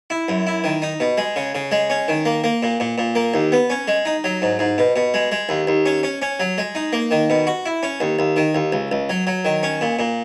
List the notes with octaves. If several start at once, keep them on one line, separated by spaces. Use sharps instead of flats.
E4
F#2
E4
D#3
D#4
B2
G#3
C#3
C#3
G#3
C#4
D#3
A#3
A#3
A#2
A#2
A#2
A#3
D#2
B3
C#4
G#3
D#4
F#3
G#2
G#2
B2
B2
G#3
G#3
D#2
D#2
C#4
C#4
C#4
F#3
G#3
D#4
A#3
D#3
B2
F#4
E4
C#4
D#2
D#2
D#3
D#2
C#2
C#2
F#3
F#3
D#3
C#4
A#2
A#2